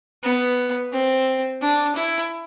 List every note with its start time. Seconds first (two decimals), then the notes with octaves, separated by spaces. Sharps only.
0.23 B3
0.92 C4
1.62 D4
1.96 E4